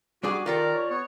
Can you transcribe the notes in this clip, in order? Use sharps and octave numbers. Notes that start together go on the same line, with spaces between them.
G3 D4 F#4 G#4 D6
D#3 F4 G4 A4 A#4 D5
C#5
B3 C#5